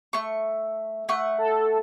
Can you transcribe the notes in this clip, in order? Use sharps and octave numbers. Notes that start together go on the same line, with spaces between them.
A3 C#6
A3 F#5 C#6
A4